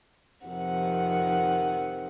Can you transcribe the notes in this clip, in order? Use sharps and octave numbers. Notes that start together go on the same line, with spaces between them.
F2 C3 D#3 F#5